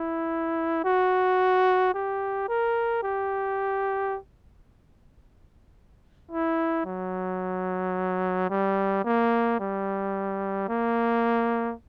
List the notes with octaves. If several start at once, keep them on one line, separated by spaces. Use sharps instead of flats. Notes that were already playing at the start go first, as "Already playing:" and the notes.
Already playing: E4
F#4
G4
A#4
G4
E4
F#3
G3
A#3
G3
A#3